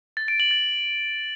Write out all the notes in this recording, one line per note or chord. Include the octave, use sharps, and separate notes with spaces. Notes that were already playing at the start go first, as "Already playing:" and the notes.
A6
D7
F#7
A6